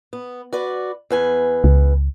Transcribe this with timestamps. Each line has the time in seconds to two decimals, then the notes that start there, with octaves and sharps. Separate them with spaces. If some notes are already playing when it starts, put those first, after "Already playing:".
0.13 B3
0.53 F#4 B4 D5
1.10 E2 B4 G#5
1.64 C#2